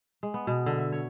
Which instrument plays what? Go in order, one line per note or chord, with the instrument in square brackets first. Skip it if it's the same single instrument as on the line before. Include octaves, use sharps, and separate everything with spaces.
[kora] G#3
B3
B2
D3
E5
C#5